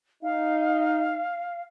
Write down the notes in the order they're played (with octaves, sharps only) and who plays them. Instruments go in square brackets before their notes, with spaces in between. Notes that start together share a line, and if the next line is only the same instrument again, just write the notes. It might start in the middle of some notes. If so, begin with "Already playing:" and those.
[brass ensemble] D#4 [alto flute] F5